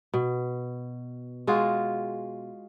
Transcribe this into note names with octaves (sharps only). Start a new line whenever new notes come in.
B2
G#3 F4 F#4 G#4